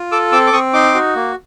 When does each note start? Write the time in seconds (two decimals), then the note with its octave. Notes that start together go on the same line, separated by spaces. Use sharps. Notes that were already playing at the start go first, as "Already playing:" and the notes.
Already playing: F4
0.12 A4 D6 E6
0.32 C4 D6 E6
0.47 D6
0.53 C4 C#6 D#6
0.73 D#4 C6 D6
0.94 F#4
1.15 A#3